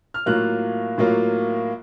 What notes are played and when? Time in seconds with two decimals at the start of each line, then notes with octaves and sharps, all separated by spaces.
0.14 F6
0.26 A2 F#3 A#3 F4 F#6
0.98 A2 F#3 A#3 F4